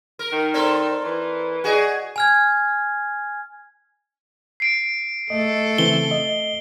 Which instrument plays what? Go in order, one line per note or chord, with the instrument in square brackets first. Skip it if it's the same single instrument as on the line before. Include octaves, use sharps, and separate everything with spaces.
[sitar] A#4
[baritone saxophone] D#3
[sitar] C4 A4 A#4 [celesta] D5 A#5 C6
[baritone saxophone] E3
[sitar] F#4 G#4 [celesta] D5 D#5 G#5
[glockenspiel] G#5 F6 G#6
[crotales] C7 D7
[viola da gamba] A3 A4 [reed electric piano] D#5
[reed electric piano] C#3 E3 C4 [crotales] G7
[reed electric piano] D#5